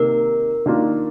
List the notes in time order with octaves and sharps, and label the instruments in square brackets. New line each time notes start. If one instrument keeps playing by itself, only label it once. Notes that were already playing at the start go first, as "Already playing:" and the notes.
Already playing: [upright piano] C3 D#3 A#3 D#4 [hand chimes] A#4
[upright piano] D#3 A#3 D4 F4